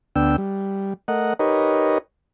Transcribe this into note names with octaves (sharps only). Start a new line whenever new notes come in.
D2 B3 D4 G5 E6
G3
A3 A#4 D#5 F#5
D#4 G4 A#4 B4 C#5 D#5